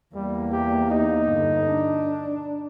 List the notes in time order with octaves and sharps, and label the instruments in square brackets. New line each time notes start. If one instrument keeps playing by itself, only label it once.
[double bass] E2 A#3 [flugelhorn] G3
[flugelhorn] G4
D#4
[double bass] G1
D4